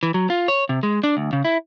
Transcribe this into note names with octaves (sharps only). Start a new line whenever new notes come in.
E3
F#3
F4
C#5
C3
G#3
D4
D2
C#3
E4